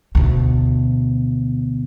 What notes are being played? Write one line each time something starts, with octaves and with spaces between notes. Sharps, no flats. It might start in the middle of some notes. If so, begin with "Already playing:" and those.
D2 B2